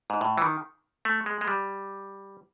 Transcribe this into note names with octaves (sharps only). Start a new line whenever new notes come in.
G#2
A2
E3
D#3
A3
G#3
G#3
G3